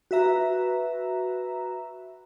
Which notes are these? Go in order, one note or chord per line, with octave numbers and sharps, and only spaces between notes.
F#4 B4 E5 A#5